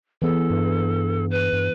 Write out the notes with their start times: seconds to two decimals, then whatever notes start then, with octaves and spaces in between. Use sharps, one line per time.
0.22 E3 B3 G#4 A4
0.50 G2
1.31 B4
1.53 G2